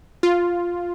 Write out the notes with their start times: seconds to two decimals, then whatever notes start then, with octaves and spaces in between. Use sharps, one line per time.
0.23 F4